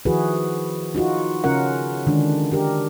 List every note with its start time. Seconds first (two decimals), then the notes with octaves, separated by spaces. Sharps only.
0.05 D#3 F3 E4 F#4 G#4 B4
0.95 D#4 F4 F#4
1.44 C#3 C#4 F4 A#4 F#5
2.07 D3 D#3 G#3 D4
2.52 D4 G4 A#4